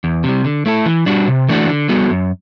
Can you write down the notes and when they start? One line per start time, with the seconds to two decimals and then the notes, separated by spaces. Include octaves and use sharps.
0.04 E2
0.24 C3 G3
0.45 D3
0.66 A3 E4 A4
0.86 E3
1.06 G3 D4 F#4
1.28 C3
1.48 E3 A3 D4 F#4
1.69 D3
1.89 G3 B3 F#4 A4
2.10 F#2